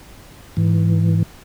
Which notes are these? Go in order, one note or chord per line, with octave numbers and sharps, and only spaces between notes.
G#2 E3